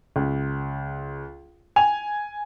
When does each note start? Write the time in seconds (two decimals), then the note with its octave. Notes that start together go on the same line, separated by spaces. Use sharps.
0.16 C#2
1.76 G#5 F7